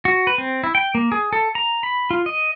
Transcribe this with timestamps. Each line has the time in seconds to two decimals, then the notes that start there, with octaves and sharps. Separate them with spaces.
0.05 F#4
0.27 B4
0.38 C4
0.64 E4
0.75 G5
0.95 A#3
1.12 G#4
1.33 A4
1.55 A#5
1.83 B5
2.11 F4
2.26 D#5